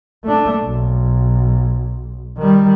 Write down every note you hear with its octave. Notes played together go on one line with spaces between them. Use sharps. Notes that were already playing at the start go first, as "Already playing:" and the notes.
A3 D4
B1
D#3 G3